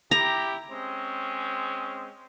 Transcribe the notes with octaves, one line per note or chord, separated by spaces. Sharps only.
E4 G4 A#5
G#3 C4 C#4